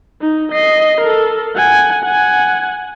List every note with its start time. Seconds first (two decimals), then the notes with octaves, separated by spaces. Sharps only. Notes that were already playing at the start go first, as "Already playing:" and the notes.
0.21 D#4
0.51 D#5 C7
1.00 A4 A#4
1.55 F#5 G#5
2.04 F#5 G#5